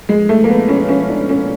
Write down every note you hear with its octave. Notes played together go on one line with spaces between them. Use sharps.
G#3
A3
A#3
B3
C#4
C#4
D4
C#4